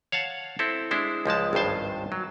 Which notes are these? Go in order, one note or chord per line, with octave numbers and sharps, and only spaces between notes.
C#5 F5 F#5 A5
C4 E4 A4
G#3 D4 E4 C5
C#2 F3 G#3 A5
G#1 C#2 G2 C5 A5
F#3